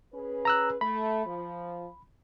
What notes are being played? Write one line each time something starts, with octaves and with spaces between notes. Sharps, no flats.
C#4 G#4 B4
A#5 E6 F#6
A3 B5
F3